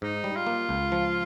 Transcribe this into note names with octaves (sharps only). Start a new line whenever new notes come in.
G#2 D#4
G3
F4
A#3
C#2
F3